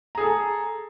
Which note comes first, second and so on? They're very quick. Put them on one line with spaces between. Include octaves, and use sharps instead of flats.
A#5 G#4 A4